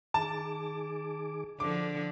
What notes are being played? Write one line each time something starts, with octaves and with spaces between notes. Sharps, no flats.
D#3 G#4 A5 D6
D3 F3 D6